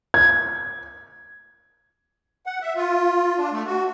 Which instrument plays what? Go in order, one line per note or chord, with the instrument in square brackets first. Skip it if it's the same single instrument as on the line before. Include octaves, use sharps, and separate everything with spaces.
[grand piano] G#6
[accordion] F#5
E5
F4
D4
A3
F#4